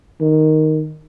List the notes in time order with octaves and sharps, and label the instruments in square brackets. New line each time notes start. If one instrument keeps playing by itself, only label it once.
[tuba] D#3